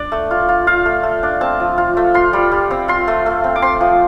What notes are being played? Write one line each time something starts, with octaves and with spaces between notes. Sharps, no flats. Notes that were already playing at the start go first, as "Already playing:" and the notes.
Already playing: D4 D5
A3
F4
F4
F4 F5
A3
A3
D4
C4 A5
F3
F4
A3
F4 C6
G3
G3
C4
F4 C6
A3
A3
C4
D6
C4 C6
F3